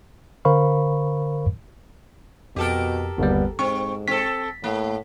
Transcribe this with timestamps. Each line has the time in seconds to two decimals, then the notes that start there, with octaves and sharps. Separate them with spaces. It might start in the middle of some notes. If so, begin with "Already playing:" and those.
0.45 D3 A#4 C5 F5 B5 C#6
2.56 F2 B2 G4 A4 A#4
3.18 G1 D#2 G3 B3
3.59 G#2 C4 C#6
4.08 C4 A4 B6
4.64 A2 A#3